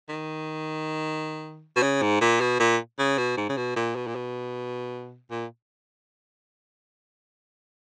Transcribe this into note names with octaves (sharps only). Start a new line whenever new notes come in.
D#3
B2
C#3
G#2
A#2
B2
A#2
C#3
B2
G#2
C#3
B2
A#2
B2
A#2
B2
A#2